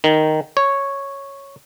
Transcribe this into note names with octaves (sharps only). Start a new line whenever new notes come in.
D#3
C#5